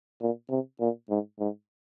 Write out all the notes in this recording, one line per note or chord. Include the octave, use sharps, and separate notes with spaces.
A#2
C3
A#2
G#2
G#2